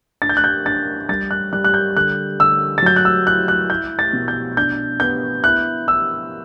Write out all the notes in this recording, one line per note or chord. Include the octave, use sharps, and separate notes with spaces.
D4 A6
G6
F#6
G6
D4 A6
G3 A6
F#6
G3 F#6
F#6
G6
D3 F#6
D3 E6
A6
F#3 G6
F#6
E6
E4 F#6
F#6
E4 G6
A6
B2
G6
D4 G6
B3 G6
E4 F#6
E4 E6